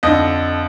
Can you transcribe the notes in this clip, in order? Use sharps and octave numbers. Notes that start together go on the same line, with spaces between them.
F2 D3 D#5